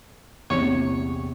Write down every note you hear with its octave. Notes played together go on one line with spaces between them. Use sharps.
A#1 E2 C3 C#5